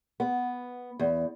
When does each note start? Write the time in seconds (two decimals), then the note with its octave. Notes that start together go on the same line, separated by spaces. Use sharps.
0.20 B3
0.99 E2